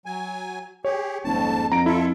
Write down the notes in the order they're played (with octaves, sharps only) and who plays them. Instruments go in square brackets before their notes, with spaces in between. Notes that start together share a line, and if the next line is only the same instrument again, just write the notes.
[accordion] F#3 G#5
[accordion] G4 G#4 [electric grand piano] C#5
[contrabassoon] D#1 [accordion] F2 G#2 A5
[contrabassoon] F2 [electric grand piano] A#5 D7
[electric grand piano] E4 [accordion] F4 A4 E5